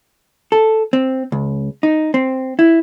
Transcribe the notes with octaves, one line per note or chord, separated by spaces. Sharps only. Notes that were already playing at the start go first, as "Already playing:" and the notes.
A4
C4
C#2
D#4
C4
E4